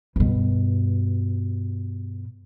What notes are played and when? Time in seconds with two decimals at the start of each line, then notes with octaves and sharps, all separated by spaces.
0.16 G2 B2